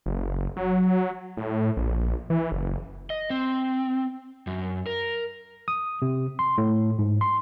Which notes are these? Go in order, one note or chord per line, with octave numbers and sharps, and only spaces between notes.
F#1
F#3
A2
A#1
E3
F#1
D#5
C4
F#2
A#4
D#6
C3
C6
A2
G#2
C6